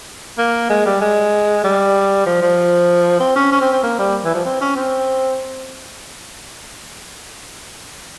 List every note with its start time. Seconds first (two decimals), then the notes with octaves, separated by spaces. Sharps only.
0.38 A#3
0.70 G#3
0.86 G3
1.01 G#3
1.64 G3
2.26 F3
2.42 F3
3.20 C4
3.36 C#4
3.52 C#4
3.61 C4
3.73 C4
3.83 A#3
3.99 G3
4.24 E3
4.35 F3
4.46 C4
4.61 C#4
4.76 C4